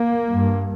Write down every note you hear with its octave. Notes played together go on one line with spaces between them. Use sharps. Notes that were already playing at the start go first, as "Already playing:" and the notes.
Already playing: A#3
G2